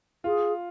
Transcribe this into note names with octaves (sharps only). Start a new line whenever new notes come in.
F4 G#4